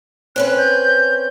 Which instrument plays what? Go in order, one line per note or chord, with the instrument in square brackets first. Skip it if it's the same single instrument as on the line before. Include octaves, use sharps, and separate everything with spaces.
[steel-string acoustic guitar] C4 C#4 B4 [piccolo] F#6
[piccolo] G6